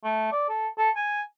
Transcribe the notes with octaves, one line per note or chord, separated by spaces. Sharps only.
A3
D5
A4
A4
G#5